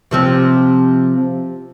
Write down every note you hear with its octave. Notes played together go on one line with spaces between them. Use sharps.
C3 F3 C4